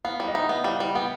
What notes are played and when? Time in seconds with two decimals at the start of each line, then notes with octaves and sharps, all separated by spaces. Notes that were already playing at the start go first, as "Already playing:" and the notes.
0.04 B3 F5
0.20 G3
0.28 D#5
0.34 D#4 E5
0.49 B3
0.64 G3 F5
0.80 G3
0.95 B3 G5